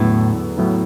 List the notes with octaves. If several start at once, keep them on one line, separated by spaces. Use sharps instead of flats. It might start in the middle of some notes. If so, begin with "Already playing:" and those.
Already playing: E2 A2 D3 F#3 B3 E4
A2 F#3 B3 E4